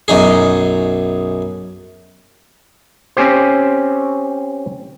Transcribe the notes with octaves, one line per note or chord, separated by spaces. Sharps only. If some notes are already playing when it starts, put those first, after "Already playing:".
B1 F#2 D#4 G#4
C4 C#4 G4 C5